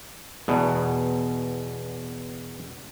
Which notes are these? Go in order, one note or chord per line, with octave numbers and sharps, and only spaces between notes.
E2 B2